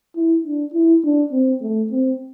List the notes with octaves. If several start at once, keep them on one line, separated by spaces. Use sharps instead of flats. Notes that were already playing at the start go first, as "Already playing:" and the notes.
E4
D4
E4
D4
C4
A3
C4